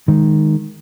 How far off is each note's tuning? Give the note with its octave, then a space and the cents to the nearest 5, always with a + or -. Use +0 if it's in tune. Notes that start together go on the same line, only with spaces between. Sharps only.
D#3 +0 G#3 +0